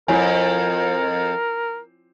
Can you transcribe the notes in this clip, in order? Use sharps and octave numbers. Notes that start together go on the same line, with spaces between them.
F2 E4 A#4 C#5 G#5